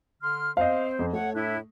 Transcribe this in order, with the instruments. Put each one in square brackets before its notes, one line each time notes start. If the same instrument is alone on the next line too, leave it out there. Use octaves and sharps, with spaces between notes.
[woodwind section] D3 C6 F6
[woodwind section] C4 C5 [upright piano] D#5 F5
[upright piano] F2
[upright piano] A3 [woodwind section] C#5 F#5
[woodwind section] A2 D4 E4